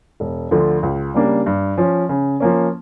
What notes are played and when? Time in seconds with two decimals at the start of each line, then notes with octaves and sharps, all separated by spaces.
0.20 E1
0.51 D2 D3 F3
0.83 C#2
1.14 C#3 G3 A#3 D4
1.46 G2
1.78 F3 C#4
2.09 C#3
2.40 F3 A#3 C#4